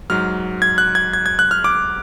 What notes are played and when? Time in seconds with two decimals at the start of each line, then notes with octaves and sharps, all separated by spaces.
0.10 G#2 F#3 F6
0.62 G#6
0.78 F#6
0.95 G#6
1.13 G#6
1.26 G#6
1.39 F#6
1.51 F6
1.64 D6